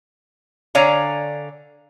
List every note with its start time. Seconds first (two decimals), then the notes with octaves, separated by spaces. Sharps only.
0.75 D3 C#5 D5 F5 G#5 A#5